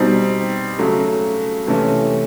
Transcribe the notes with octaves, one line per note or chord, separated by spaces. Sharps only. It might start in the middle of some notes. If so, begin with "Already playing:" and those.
Already playing: B2 G3 C4 D#4
C#3 F#3 A3
C3 E3 A3 C#4